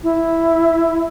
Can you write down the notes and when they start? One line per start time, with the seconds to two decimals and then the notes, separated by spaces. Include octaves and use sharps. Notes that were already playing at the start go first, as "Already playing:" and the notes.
0.03 E4